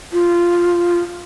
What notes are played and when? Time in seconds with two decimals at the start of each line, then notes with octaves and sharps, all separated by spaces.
0.13 F4